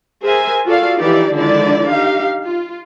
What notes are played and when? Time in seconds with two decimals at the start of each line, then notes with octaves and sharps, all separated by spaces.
0.23 G#4 A#4 C5 E5 G#5
0.66 F4 F#4 A4 D5 F5
0.98 E3 F3 D#4 E4 G4 D5
1.32 D3 D#3 F3 G#3 E4 D5
1.87 D#4 G4 F5
2.43 F4